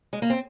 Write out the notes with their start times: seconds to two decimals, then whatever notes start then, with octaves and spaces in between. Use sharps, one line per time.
0.13 G#3
0.22 A#3
0.30 C4